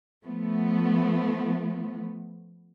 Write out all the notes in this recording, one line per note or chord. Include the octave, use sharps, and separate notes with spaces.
F3 A3 B3